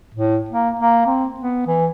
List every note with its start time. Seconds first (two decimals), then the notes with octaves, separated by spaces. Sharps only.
0.15 A2
0.50 A#3
0.80 A#3
1.06 C4
1.40 B3
1.67 E3